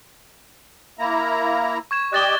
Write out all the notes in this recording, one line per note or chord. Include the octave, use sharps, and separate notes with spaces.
A#3 E4 A#5
C#6 G#6 E7
G4 D5 D#5 F#6 A6 G7